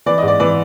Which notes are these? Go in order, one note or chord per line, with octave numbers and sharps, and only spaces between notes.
E3 D5
G#2 D#5
D5
E3 D5